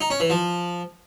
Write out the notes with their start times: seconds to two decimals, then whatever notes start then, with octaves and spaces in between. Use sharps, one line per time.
0.01 D#4
0.10 C#4
0.20 E3
0.30 F3